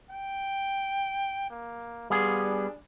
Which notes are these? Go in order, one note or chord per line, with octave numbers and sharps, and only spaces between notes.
G5
A#3
G3 B3 F4 G#4
D4